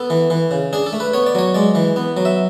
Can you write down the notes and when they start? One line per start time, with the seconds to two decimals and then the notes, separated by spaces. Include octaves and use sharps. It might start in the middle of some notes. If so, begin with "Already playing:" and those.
Already playing: B3 A4
0.10 E3
0.30 E3
0.51 C#3
0.73 D4 G#4
0.86 A4
0.93 A3
1.00 B4
1.14 B3 C#5
1.26 D5
1.35 F#3 C#5
1.54 G#3 D5
1.75 E3
1.96 B3
2.17 F#3
2.25 E5